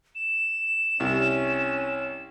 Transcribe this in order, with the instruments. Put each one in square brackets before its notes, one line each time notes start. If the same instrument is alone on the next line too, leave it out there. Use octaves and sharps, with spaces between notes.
[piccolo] E7
[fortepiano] C2 [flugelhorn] C#4